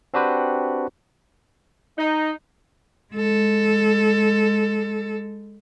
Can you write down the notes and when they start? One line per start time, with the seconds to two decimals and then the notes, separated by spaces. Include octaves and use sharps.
0.14 C4 D4 F#4 G4 B4 C5
1.97 D#4
3.14 G#3 A4